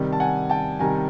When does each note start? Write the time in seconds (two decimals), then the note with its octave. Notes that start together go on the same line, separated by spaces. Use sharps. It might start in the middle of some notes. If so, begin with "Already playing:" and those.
Already playing: C3 D#3 G3
0.13 A5
0.20 F#5 G#5
0.49 G5 A5
0.79 C3 D#3 G3 G#5 A#5